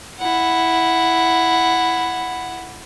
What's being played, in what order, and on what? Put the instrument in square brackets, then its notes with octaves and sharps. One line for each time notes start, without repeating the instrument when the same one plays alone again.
[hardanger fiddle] E4 F#5